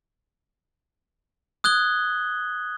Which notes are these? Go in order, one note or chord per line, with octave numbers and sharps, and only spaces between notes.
D#6 F#6 G#6 G7